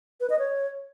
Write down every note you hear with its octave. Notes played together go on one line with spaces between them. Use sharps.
B4
D#5
C#5